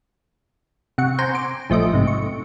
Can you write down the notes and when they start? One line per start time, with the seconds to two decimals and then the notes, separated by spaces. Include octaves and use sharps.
0.98 C3 F#5 C#6
1.19 C5 G5 G#5 A#5 C7
1.35 D6
1.70 A#1 F3 A3 D#5 D7
1.93 G#2 C3
2.07 C#6